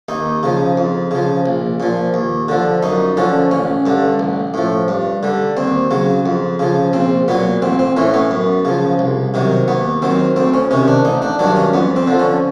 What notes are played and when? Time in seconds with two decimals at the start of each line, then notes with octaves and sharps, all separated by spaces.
0.09 D#2 D#4
0.43 C#3 F3
0.77 F2
1.11 C#3 F3
1.46 A#1
1.80 A#2 F3
2.14 D#2
2.48 D3 F3
2.83 F#2 D#4
3.17 D3 F3 C#4
3.51 A1 C#4
3.86 G2 D3
4.19 A1
4.54 A2 F3
4.88 G2
5.23 D3 G3
5.57 D#2 C4
5.91 C#3 F#3
6.26 F2
6.59 C#3 F3
6.93 A#1 C4
7.28 A#2 F#3 B3
7.62 A1 C4
7.79 C4
7.97 A2 E3 C#4
8.14 B3
8.31 F#2
8.65 C#3 F3
8.99 C2
9.34 C3 D#3 F#3
9.68 D#2 B3
10.02 D#3 F#3 C4
10.36 D2 C4
10.54 C#4
10.71 C3 D#3 C#4
10.88 D4
11.05 A1 D#4
11.22 D4
11.39 G2 D#3 F#3 D4
11.56 C#4
11.73 F2 B3
11.96 C4
12.07 D3 F3
12.19 C#4